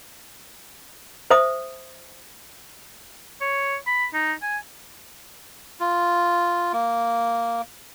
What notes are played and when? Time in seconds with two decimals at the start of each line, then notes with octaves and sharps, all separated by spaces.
1.31 C5 E5 D#6
3.41 C#5
3.87 B5
4.14 D#4
4.42 G#5
5.80 F4
6.73 A#3